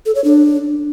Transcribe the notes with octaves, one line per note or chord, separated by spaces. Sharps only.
A4
C#5
D4